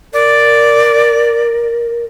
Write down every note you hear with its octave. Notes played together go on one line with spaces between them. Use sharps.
A#4 D5